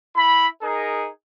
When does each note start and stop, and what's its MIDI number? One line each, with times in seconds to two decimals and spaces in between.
0.16 0.47 64
0.16 0.47 83
0.63 1.09 63
0.63 1.09 68
0.63 1.09 70